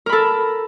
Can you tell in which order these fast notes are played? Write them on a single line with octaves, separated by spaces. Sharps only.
A#4 B5 A4